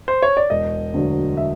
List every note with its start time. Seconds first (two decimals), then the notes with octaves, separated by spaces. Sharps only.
0.08 C5
0.22 C#5
0.37 D5
0.50 E1 D#5
0.94 D2 D3 F#3
1.37 E5